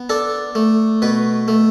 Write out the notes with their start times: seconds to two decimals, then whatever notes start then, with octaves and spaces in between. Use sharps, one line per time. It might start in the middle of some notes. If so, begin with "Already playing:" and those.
Already playing: B3
0.09 D4 A4
0.55 A3
1.02 B2 B4
1.48 A3